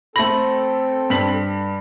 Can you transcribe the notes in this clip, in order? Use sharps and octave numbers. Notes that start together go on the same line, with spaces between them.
A3 C4 A4 B5 A#6
G2 B6 F#7